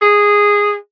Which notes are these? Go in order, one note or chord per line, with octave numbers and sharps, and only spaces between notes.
G#4